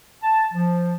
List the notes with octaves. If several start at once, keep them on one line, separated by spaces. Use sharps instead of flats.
A5
F3